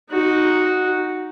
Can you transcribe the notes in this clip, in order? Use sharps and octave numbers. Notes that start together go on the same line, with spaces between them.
D#4 F#4